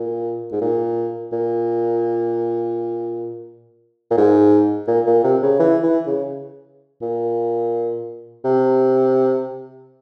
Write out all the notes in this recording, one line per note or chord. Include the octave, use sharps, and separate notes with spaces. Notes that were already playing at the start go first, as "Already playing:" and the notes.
Already playing: A#2
G#2
A#2
A#2
A#2
G#2
A#2
A#2
C3
C#3
E3
E3
C#3
A#2
C3